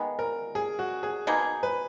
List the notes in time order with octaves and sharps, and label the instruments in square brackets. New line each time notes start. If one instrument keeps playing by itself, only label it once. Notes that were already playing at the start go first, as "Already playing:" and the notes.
Already playing: [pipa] D#3 G#3 B3
[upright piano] A#4
G#4
F#4
G#4
[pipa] B2 A#3 D#4 G#4
[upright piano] B4